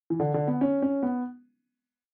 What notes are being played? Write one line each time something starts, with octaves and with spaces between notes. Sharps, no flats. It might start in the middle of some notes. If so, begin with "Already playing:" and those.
E3
D3
D3
B3
C#4
C#4
B3